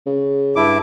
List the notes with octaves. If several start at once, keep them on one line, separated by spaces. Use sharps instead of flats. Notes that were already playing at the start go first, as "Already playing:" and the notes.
C#3
G2 E4 D6